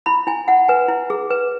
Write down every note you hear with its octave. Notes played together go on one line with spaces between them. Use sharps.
E4 B5
E4 G#5
E4 F#5
B4 G#5
E4
G#4
B4